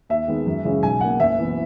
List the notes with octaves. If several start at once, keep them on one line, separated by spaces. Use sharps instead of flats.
D#2 E5
D#3 G#3 B3
F#2
C#3 E3 G#3 C#4
B1 G#5
B2 A#3 F#5
F#1 E5
E3 B3